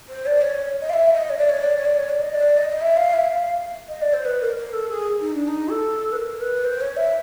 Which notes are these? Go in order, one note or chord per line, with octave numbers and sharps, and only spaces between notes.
C5
D5
C#5
D#5
F5
E5
D#5
C#5
D5
C#5
D5
C#5
D5
C#5
D5
D#5
D5
D#5
D#5
E5
F5
E5
F5
D#5
D5
C5
B4
A#4
A#4
A4
G#4
D#4
D4
D#4
A4
B4
A#4
B4
C5
C#5
E5